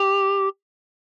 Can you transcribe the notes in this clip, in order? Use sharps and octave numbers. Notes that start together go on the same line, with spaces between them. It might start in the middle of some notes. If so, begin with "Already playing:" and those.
Already playing: G4